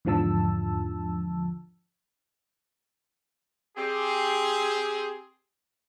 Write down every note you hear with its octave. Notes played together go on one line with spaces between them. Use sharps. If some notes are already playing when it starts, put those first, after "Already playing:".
E2 G#2 D3 F3 A5 E6
C4 G4 G#4